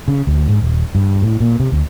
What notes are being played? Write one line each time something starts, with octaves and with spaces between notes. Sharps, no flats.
C#3
D2
G#2
D#1
G2
A2
A#2
C3
D2